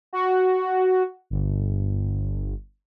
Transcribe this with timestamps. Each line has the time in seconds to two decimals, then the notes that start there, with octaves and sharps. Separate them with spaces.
0.13 F#4
1.30 G1